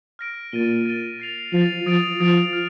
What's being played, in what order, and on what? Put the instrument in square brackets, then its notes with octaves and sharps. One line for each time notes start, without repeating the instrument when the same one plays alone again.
[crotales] F6 A#6 D7
[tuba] A#2 [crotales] A6 D#7 G7
[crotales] A6 D#7 G7
A6 C7 F7
[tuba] F3 [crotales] A6 C7 F7
[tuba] F3 [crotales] D#6 A6 D7 F7
[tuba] F3 [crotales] D#6 A6 D7 F7
[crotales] F6